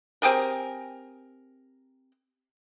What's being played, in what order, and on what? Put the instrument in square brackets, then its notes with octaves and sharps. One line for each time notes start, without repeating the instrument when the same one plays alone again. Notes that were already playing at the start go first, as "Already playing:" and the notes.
[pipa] C4 G4 G#4 A#4